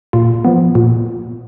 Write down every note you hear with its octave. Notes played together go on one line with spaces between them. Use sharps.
A#2 F4
F3 B3
A#2